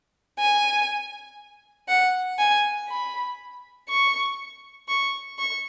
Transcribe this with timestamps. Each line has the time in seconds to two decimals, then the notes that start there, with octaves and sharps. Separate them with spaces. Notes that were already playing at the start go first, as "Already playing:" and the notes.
0.39 G#5
1.89 F#5
2.39 G#5
2.89 B5
3.89 C#6
4.88 C#6
5.39 C#6